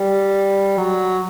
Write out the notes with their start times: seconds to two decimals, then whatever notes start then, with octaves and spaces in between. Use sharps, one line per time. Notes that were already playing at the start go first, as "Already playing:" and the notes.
Already playing: G3
0.78 F#3